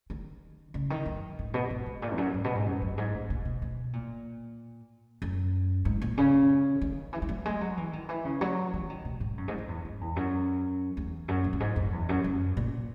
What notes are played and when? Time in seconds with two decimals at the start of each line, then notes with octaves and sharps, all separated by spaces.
0.10 D#3
0.74 C#3
0.90 D#3
1.06 F#2
1.39 G#2
1.54 B2
1.70 G#2
1.86 G#2
2.02 A#2
2.13 E2
2.18 F#2
2.34 G#2
2.44 B2
2.55 G#2
2.66 F#2
2.82 F#2
2.98 G#2
3.14 A#2
3.30 A#2
3.45 B2
3.62 B2
3.93 A#2
5.22 F#2
5.85 G#2
6.02 A#2
6.18 C#3
6.81 D#3
7.13 E3
7.22 G#3
7.29 F#3
7.46 G#3
7.61 F#3
7.77 E3
7.93 D#3
8.09 E3
8.25 C#3
8.41 F#3
8.74 E3
8.90 D#3
9.05 B2
9.20 G#2
9.38 F#2
9.48 G#2
9.58 F#2
9.69 E2
9.85 G#2
10.01 E2
10.16 F#2
10.97 E2
11.28 F#2
11.44 A#2
11.53 F#2
11.60 G#2
11.76 F#2
11.93 E2
12.09 F#2
12.24 F#2
12.57 A#2